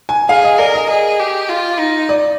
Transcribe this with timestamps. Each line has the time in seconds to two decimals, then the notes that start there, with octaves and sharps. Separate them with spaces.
0.09 G#5
0.29 G#4 F5
0.44 D#5
0.58 A#4 D5
0.74 D#5
0.89 G#4
1.20 G4
1.49 F4
1.79 D#4
2.09 D5